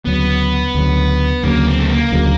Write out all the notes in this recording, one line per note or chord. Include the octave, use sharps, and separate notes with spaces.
D2 C#3 F#3 B3
D2 C#3 F#3
D2 C#3 F#3 A#3
C4
A3
A#3
D2 C#3 F#3